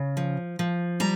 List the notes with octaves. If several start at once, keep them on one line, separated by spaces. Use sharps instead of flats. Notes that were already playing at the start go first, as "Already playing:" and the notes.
Already playing: C#3
F3
F3
G3 A#5